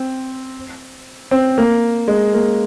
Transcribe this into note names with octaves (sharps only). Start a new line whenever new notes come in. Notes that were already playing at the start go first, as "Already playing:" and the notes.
Already playing: C4
C4
A#3
G#3
A#3